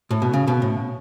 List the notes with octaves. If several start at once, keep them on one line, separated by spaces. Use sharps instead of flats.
A2
B2
C#3
B2
A2